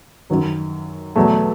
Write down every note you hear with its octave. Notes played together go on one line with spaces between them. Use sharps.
F#2 D#3 F#3
E2 B2 F#3 A3